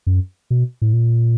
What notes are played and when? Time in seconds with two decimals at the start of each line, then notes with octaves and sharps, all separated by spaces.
0.07 F#2
0.50 B2
0.82 A2
0.93 A#2